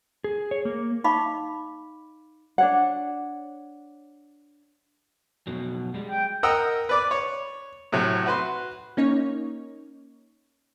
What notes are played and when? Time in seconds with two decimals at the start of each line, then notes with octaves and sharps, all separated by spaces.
0.24 G#4
0.51 C#5
0.65 A#3
1.04 D#4 D#5 F5 B5 C#6 D6
2.58 D4 C#5 F#5
5.47 F2 B2 F#3
5.94 G3 G#3
6.10 G5
6.43 A#4 D#5 F#5 G5 A#5 E6
6.89 B4 D5 D6
7.11 C#5
7.92 A2 C3 F#3
8.26 F#4 B4 C6
8.97 A#3 C#4 D#4 C#5